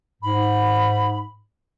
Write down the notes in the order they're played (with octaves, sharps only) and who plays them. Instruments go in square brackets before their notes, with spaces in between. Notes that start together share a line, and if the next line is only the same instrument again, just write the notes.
[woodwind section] G#2 [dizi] B5